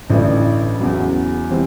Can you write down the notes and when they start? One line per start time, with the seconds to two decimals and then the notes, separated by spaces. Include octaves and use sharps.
0.10 A1 A2 E3 A3 D4
0.79 E2 C#3 F#3
1.50 C3 E3 G3 C4